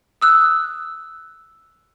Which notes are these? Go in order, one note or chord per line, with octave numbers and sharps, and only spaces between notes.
D#6 E6 F#6